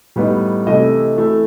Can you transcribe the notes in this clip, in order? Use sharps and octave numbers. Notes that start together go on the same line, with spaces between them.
A2 G3 B3 D#4
C3 E3 A3 E4 D#5
E3 A3 E4